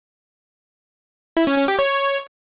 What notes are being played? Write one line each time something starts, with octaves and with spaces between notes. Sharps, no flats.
E4
C#4
C#4
G4
C#5